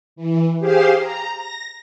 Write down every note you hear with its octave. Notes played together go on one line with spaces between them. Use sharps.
E3
G4 G#4 C5 F5 C6
A#5
A#6